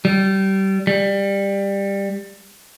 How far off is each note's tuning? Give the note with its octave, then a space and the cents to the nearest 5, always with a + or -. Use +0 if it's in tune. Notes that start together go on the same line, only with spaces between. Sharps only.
G3 -25
G3 +15